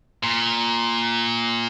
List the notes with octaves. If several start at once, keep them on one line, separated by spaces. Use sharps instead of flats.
A#2